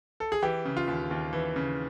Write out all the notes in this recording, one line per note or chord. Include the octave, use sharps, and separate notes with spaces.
A4
G#4
E3 G4
C#3
F4
D#2
D#2
E3
C#3